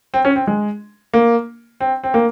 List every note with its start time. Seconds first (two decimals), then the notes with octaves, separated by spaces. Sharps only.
0.14 C4
0.25 C#4
0.36 C4
0.47 G#3
1.14 A#3
1.81 C4
2.03 C4
2.14 A#3